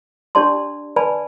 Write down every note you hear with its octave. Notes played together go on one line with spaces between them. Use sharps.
D4 G4 D5 A5 C6
B4 D5 G#5 A5 B5